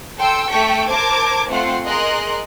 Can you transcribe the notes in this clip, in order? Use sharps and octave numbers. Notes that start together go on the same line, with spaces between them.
A4 G5 C6 E6
A3 A4 G5 C#6 B6
A#4 C5 A5 D6 G#6
A3 C4 F4 F#5 C6
G#4 A#4 D#5 C6 F#6